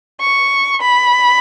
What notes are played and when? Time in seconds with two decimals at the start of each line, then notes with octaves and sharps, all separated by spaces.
0.21 C#6
0.81 B5